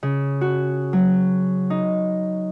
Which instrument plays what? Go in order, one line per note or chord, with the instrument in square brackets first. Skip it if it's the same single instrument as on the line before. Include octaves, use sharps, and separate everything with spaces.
[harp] C#3
F#4
F#3
D#4